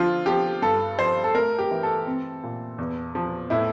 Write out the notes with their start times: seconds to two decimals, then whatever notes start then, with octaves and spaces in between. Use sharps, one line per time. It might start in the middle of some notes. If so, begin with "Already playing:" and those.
Already playing: D3 F3 F4
0.26 F3 G4
0.62 G2 A4
0.98 F3 C5
1.24 A4
1.34 A3 A#4
1.59 G4
1.71 E3
1.83 A4
2.06 C4
2.43 A#2
2.78 E2
3.15 F3
3.50 A2 E4